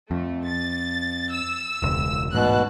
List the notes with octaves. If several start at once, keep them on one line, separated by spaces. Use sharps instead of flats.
F2 A3
A6
E6
E1 C#2
A1 G#2 B2 A5 F#6